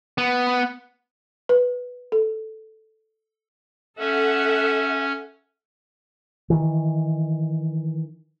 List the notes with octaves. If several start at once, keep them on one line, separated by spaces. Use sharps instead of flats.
B3
B4
A4
C#4 A4 E5 F#5
D#3 E3